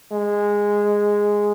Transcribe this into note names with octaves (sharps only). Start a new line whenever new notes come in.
G#3